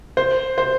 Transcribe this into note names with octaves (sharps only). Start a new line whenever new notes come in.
C5
C5